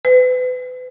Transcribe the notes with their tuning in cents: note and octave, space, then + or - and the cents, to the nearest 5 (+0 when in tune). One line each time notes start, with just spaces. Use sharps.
B4 +35